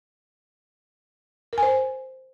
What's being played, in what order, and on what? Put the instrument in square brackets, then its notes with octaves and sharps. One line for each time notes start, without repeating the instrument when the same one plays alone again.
[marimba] A#4
G#5
C5